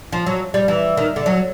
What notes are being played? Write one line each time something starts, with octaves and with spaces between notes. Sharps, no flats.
F3
F#3
G3
E3
D#3
D3
F#3